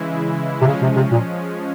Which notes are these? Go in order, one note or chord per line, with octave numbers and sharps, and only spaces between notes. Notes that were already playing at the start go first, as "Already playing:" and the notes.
Already playing: C#3 E3 G#3 E4
C3
C#3 F3 G#3 C#4
C3
C3
A#2